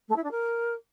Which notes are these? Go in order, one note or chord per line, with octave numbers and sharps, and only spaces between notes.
A3
E4
D4
A#4